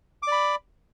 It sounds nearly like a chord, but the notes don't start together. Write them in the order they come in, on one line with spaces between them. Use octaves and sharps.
D6 D5 B5